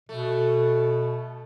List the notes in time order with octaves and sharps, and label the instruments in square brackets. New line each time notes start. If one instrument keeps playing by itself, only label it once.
[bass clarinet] B2 [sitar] A3